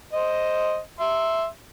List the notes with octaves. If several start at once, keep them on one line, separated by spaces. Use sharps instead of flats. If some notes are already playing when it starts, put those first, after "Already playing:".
C5 D#5
E5 C6